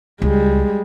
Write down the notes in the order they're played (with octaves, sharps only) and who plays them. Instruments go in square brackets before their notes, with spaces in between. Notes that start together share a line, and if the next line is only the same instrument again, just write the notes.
[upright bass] C#2 [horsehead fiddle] G3 G#3